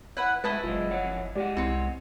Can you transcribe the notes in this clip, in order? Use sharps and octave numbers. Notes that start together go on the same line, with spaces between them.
E4 B4 C#5 F#5
A2 G#3 E4 B4 D#5 E5 A5
F#1 A#2 F#3 G#3 F4
F2 C#5 F#5
G#3 G4 D5 D#5 F#5
C2 C4 E4 C#5 C6